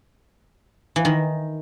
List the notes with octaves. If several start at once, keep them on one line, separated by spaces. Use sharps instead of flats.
E3
D#3